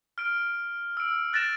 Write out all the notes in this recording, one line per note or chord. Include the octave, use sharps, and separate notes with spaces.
F6 D7
E6 D7
F#6 A6 A#6 D7 E7